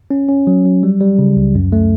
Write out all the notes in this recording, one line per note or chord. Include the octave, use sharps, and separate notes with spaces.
C#4
C#4
F#3
F#3
G3
G3
C#3
C#2
F#2
A3